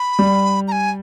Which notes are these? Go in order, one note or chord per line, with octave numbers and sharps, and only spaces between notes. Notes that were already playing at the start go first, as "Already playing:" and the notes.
Already playing: B5
G3
A#5
G#5